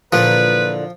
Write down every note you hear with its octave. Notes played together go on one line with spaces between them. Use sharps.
A#2 D3 E3 F3 B4